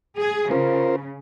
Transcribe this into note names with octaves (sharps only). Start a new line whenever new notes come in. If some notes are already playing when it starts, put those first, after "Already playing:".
G#4
C#3 F4 A#4 C5